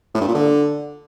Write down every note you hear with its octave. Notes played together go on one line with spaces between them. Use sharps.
A2
G2
A#2
D3